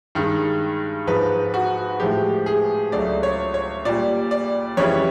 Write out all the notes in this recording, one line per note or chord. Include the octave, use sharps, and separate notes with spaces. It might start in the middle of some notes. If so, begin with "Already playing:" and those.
G2 D#3 G#3
G#2 F3 G#3 B4
F#4
A2 F3 G#3 G4
G#4
C#2 C#3 F#3 A3 D5
C#5
C#5
A#2 G3 D5
D5
F2 C#3 E3 G3 C#5